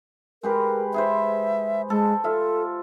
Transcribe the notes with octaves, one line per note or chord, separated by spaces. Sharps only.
G#3 G4 A#4 B4
G#4 B4 C5 E5
G#3 A4
F4 A4 E5